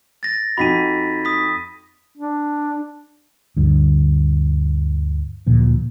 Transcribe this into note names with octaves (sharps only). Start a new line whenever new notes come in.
A6 A#6
F2 D#4 F#4 B5 B6 D#7
D#6 B6
D4
D2 G2
D2 A#2 F3